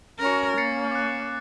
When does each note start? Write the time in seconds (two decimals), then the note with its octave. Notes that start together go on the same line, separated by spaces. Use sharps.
0.19 C#4 F#4 A#4
0.58 A#3 A6 C7 C#7
0.91 D6 F#6